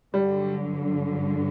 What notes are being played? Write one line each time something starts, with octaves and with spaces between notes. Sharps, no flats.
G2 D3 F#3 G3